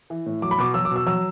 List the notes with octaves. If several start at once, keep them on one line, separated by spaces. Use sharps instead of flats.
E3
A2
F#3 D6
B5
B2 D6
F#3 E6
D6
B2 E6
F#3 E6